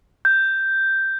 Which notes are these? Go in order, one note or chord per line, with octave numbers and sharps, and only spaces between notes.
G6